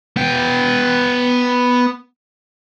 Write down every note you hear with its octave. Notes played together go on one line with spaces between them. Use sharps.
B3 G5